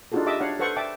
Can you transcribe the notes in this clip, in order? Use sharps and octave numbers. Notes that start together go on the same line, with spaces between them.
D4 D#4 F4 F#4 G#4 A4
G4 D#5 E5 D6 E6
D4 C#5 F5 F#5
A4 B4 C5 F#5 C#6
D5 E5 G5 A5 D6